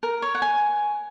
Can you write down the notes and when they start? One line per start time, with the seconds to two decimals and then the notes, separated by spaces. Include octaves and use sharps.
0.03 A#4
0.22 C#5
0.35 F#5
0.42 G#5